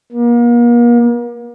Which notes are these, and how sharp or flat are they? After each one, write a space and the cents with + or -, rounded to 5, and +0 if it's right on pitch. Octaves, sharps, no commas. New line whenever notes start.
A#3 +40